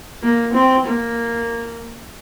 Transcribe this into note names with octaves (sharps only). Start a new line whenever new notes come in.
A#3
C4
A#3